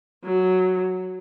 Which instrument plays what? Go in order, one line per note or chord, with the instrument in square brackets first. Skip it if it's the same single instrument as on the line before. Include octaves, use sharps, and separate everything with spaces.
[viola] F#3